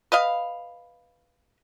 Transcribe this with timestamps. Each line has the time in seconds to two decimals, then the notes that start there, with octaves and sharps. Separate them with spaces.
0.12 B4 D#5 F5